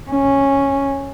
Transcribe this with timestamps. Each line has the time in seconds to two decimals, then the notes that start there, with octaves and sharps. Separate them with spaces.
0.11 C#4